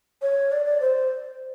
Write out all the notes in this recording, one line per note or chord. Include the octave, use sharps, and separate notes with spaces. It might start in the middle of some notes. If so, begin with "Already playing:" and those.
C#5
D5
D5
C5